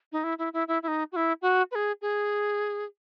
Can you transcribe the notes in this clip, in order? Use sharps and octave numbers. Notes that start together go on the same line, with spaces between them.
D#4
E4
E4
E4
E4
E4
D#4
F#4
E4
F#4
B4
G#4
G#4